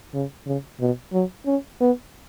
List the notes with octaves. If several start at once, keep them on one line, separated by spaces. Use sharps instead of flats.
C#3
C#3
B2
F#3
C#4
B3